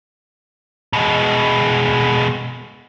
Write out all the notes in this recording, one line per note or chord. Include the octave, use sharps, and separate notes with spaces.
B2 G#3